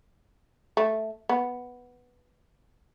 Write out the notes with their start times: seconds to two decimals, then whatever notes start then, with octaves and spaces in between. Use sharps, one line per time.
0.77 A3
1.29 B3